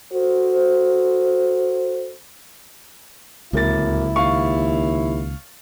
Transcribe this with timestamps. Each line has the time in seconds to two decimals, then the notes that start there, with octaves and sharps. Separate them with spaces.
0.11 F#4 A4 C5
3.53 D1 C#2 A#3 E4 A6
4.16 D#2 F5 C#6